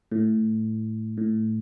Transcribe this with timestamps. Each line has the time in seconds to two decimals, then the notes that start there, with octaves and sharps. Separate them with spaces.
0.12 A2
1.18 A2